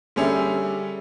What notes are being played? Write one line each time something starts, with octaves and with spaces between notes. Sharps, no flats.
D3 G3 C#4 G#4 E5